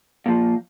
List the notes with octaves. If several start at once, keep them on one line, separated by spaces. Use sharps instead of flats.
A#2 F3